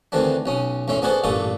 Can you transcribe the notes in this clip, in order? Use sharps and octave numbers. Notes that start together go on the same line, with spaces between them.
D2 D#3 E3 A3 C4 D4
B1 C#4 D#6
E2 A2 C#4 E5 C6
B3 D4 F#4 G#4 A4 C5
A1 G2 A#2 A4 C#6 D#6